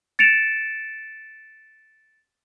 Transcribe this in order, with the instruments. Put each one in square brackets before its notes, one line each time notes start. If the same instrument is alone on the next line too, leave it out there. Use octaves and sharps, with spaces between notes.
[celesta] A6 C#7 D7 E7 F7